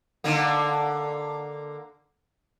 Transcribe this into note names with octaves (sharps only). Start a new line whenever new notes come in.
D3 A#3